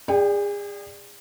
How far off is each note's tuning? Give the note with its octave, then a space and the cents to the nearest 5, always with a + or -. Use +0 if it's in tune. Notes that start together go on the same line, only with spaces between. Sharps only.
G#4 -35 D5 +0 G5 +10